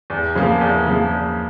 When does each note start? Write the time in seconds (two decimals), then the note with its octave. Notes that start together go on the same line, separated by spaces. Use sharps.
0.10 E2
0.35 C#3 F3 A#3
0.61 E2
0.87 C#3 F3 A#3
1.12 E2